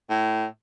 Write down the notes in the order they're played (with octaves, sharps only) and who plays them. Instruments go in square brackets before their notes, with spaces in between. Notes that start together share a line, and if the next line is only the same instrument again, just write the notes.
[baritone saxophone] A2